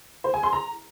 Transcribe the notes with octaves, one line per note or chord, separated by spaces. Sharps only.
C5
G#5
C6
A#5